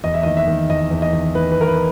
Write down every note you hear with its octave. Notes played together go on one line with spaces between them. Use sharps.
E2 D#5
E5
D#5
D#3
E5
D#3
E2 D#5
E2
D#5
D#3
D#3 B4
B4
E2 A#4
B4